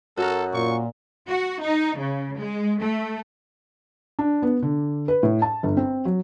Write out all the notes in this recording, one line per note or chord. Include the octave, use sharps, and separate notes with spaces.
F#2 F#4 A4 A#4
A#2 C#6
F#4
D#4
C#3
G#3
A3
D4
B3
D3
B4
A2
A5
G1
C4
F#3